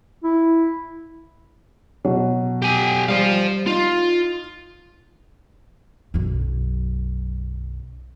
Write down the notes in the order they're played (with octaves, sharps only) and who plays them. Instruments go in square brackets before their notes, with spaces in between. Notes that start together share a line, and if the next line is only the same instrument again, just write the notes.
[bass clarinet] E4
[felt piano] B2 F#3
[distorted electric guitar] G4 G#5
[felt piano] G3 [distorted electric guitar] C5 F5
[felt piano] D#4 [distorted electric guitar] F4
[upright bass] B1 F#2